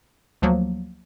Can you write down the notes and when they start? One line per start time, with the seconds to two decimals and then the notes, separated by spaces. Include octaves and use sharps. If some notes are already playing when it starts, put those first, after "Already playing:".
0.42 D2 F3 F#3 A#3